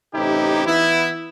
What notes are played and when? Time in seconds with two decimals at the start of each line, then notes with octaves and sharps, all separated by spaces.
0.13 A1 C3 D#4 E4 G4
0.66 E3 B3 E4